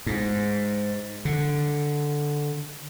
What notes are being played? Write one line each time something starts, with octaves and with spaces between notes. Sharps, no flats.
G#2
D3